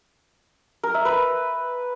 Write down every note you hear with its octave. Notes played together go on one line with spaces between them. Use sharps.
A#4
E5
B4